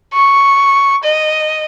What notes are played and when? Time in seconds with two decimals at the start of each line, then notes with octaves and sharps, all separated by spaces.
0.14 C#6
1.04 D#5